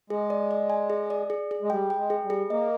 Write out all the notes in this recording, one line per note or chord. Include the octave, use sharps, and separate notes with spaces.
G#3 G#4
D5
D5
G#5
G#4
D5
G#4
G#4
G#3
G3 G5
G5
G#3
G#4
G3
G#4
A#3 D#5